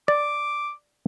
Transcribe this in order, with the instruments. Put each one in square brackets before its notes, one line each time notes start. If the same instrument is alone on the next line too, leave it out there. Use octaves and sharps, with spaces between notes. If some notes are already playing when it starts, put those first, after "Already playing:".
[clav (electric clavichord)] D5 [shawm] D6